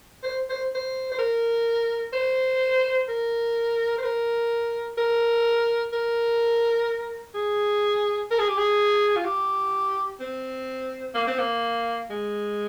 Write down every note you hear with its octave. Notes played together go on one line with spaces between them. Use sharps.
C5
C5
C5
C5
A#4
C5
A#4
C5
A#4
A#4
A#4
G#4
A#4
G#4
G4
G#4
F4
G4
C4
A#3
C4
A#3
G#3